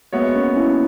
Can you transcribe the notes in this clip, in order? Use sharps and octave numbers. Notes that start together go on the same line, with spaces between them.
G#3 A#3 B3 F#4 C#5 E5
A#3 C#4
C#4 E4